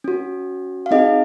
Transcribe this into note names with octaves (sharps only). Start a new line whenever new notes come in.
C#4 F#4
F5
C4 D#4 G#4 D#5